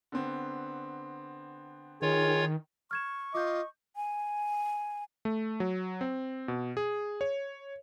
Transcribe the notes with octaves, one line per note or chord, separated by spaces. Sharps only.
D3 B3 C4
D#3 F4 G#4 C#5
C#6 F6 G#6 E7
F4 D#5 D6 G6
G#5
A3
F#3
C4
B2
G#4
C#5